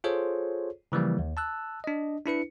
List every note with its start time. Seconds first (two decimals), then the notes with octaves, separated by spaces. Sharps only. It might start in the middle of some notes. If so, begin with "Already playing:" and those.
0.04 F4 G#4 A4 C5 C#5
0.92 C#3 E3 F3 G3 A#3
1.19 D#2
1.37 A5 E6 F#6
1.84 D4 D#5
2.26 D4 E4 B4 C#7